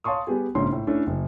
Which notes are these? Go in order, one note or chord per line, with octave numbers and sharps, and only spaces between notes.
C#5 F5 A5 C6 C#6 D#6
G3 B3 G4 G#4
A#1 G#2 C#3 C#4 C6
A2
A3 C#4 D4 E4
F#1